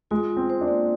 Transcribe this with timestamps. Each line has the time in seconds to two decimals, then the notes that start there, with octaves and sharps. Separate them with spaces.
0.11 G#3 F4
0.30 F4
0.37 C4
0.50 C5
0.61 D4
0.68 A#3